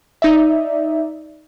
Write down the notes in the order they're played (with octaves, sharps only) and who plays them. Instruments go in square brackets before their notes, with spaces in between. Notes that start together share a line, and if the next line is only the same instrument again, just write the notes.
[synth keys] D#4 D5 E5